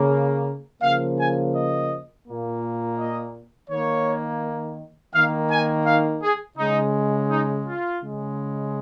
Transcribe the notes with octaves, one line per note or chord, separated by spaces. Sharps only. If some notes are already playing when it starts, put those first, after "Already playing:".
Already playing: C#3 A#3
C#3 F3 A#3 F5
G#5
D#5
A#2 A#3
D#5
D#3 A#3 C#5
D#3 A#3 F5
G#5
F5
G#4
C#3 G#3 D#4
D#4
F4
C#3 G#3